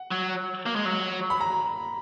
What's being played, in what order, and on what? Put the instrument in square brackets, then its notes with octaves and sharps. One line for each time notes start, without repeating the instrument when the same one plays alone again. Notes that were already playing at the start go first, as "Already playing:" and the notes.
Already playing: [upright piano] F#5
[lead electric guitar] F#3
A#3
G#3
F#3
[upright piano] B5
A#5